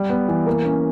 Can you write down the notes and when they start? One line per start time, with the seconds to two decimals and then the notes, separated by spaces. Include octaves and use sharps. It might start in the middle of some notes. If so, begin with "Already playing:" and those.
Already playing: G3
0.10 B3
0.28 E3
0.46 A#3
0.65 C#4